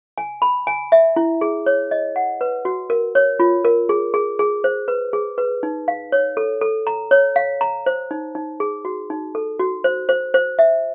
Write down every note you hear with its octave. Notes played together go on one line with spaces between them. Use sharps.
G#5
B5
G#5
E5
E4
G#4
C#5
D#5
F#5
B4
F#4
A#4
C#5
F4
A#4
G#4
G#4
G#4
C5
B4
G#4
B4
D#4
F5
C#5
A4
A4
A#5
C#5
F5
A#5
C5
D#4
D#4
G#4
F#4
D#4
A4
F#4
C5
C5
C5
E5